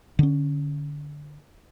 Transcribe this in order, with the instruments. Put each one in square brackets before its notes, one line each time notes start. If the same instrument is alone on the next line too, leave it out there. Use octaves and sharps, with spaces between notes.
[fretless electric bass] D3 C#4